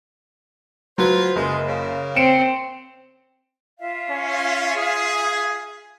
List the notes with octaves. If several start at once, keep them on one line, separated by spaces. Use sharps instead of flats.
F#3 F4 B4 C5
F#1 G#3
C#3 A#3
C4 C#7 D7 E7
F4 E5 F5
C#4
G#4